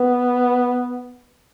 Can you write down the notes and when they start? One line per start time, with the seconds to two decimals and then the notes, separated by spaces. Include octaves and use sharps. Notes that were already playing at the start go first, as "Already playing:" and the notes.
Already playing: B3